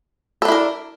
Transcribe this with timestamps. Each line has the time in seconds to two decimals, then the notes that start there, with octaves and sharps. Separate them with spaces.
0.42 A4
0.45 D4
0.48 E4
0.52 A#4